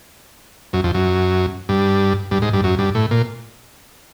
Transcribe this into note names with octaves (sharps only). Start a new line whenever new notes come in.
F#2
F2
F#2
G2
G2
G#2
G2
F#2
G2
A2
A#2